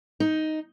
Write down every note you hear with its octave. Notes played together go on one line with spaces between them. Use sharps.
D#4